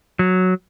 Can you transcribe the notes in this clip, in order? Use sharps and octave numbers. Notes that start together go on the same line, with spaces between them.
F#3